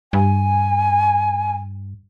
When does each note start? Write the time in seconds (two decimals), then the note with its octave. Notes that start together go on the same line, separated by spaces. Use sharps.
0.13 G2 G#5